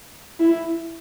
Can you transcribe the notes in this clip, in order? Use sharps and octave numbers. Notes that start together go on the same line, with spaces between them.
E4